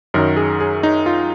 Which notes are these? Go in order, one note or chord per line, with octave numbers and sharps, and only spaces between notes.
F#2 D#3 F#3 A#4
G#4
G#4
D#4
F4